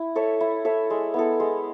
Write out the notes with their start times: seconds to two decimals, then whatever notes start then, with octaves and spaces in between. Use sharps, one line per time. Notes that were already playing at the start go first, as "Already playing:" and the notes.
Already playing: E4
0.15 A4 C#5 E5
0.41 E4
0.65 A4 C#5 E5
0.90 G#3
1.14 B3 E4 A4
1.40 G#3